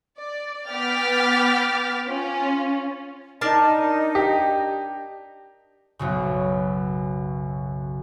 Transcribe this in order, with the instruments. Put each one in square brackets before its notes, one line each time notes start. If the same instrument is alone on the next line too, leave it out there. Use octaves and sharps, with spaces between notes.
[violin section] D5
B3 G5 D6 F6 A6 B6
C#4 F4
[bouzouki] D4 A#4 A5 [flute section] D#4 D#5
[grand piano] G4
[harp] B1 F#2 C#3